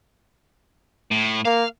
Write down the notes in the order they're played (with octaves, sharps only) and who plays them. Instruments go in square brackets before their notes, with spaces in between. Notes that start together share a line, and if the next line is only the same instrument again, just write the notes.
[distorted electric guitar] A2
[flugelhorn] A#3 [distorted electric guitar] F5